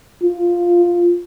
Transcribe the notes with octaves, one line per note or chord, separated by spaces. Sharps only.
F4